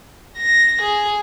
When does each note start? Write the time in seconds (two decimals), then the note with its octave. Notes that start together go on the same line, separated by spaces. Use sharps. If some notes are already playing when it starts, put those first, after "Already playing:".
0.38 A#6
0.82 G#4